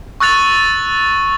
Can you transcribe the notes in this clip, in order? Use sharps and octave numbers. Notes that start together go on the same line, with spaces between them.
C#6 E6 F#6 A6 F7